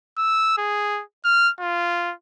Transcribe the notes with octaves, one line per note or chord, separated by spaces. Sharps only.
E6
G#4
F6
F4